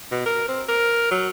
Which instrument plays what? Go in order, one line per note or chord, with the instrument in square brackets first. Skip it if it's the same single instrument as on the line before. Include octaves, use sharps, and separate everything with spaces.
[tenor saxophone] B2
A#4
C4
A#4
F#3